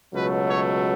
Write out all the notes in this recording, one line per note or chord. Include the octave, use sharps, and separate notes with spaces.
C#2 B2 F#3 A3 B4
C#5